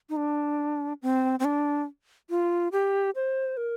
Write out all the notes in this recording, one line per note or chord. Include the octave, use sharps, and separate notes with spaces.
D#4
D4
C4
C4
D4
F4
G4
C5
A#4